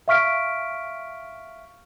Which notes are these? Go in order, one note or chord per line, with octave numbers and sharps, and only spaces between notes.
E5 F5 C#6 F6 B6 D7